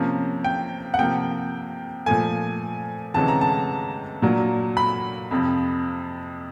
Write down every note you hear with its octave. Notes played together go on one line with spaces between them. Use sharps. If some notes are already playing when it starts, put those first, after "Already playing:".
Already playing: C3 F3 A#3 C#4
G5
F#5
C3 F3 A#3 G5
A#2 F3 A3 G#5
D2 C3 E3 G#3 C#4 A5
A#5
A5
A#2 F#3 A#3 D4
B5
F2 C3 F3